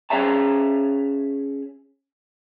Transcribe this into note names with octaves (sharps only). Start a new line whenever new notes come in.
C#4 G#4 C#5 E5 A5